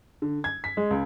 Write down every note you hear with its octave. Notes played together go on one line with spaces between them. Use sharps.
D3
G#6
B6
G#3
C#2